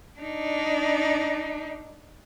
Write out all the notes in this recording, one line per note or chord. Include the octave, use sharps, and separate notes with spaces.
D4 D#4